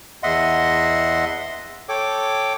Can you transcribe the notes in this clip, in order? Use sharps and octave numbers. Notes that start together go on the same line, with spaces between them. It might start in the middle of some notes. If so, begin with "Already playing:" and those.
E2 D#5 E5 F#5 C6
A4 C#5 G5 D6